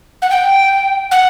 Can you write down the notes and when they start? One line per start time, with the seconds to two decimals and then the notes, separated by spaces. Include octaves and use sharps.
0.22 F#5
0.31 G5
1.11 F#5